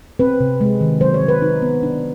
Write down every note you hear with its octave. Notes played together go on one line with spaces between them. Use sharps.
C4 B4
C3
G#3
D#3
F#3 C5
C#5
F#3
B4
D#4
B3
D4